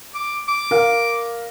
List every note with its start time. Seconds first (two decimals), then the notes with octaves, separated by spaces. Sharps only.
0.15 D6
0.48 D6
0.71 A#4 F5